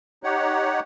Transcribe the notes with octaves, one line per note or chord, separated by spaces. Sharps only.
D#4 G4 C#5 F#5